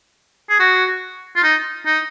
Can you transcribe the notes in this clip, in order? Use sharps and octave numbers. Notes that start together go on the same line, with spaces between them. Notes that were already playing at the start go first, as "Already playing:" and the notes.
G#4
F#4
F4
D#4
D#4